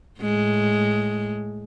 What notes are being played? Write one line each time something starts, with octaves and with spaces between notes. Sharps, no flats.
A2 G#3